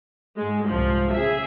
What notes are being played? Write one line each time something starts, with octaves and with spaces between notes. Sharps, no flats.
G#2 G#3
C2 G#2 F3
C#3 G#4 E5